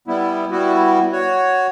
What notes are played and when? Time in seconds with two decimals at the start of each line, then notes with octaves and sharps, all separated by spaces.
0.08 G3 B3 E4
0.51 G3 B3 E4 F#4
1.12 F#4 C#5